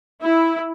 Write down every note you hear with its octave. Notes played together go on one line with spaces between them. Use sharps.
E4